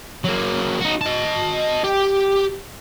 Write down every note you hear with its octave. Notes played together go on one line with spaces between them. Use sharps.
F#3 A#3
D#4 F#4
D#5 A5
G4